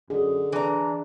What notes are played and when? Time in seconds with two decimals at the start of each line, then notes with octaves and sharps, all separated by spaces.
0.10 F#2 D3 G#4
0.52 E3 D4 A#5